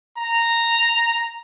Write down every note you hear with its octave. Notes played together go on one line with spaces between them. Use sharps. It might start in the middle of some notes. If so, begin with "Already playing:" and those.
A#5